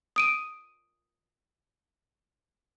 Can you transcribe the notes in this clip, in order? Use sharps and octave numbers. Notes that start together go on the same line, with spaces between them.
D#6 D7 D#7